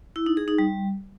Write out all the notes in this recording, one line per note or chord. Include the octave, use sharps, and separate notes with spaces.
E4
D#4
G#4
D#4
G3